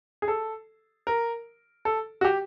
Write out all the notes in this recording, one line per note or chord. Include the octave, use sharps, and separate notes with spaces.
G#4
A4
A#4
A4
F#4
G4